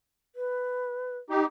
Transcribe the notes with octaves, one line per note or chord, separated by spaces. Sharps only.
B4
D#4 G4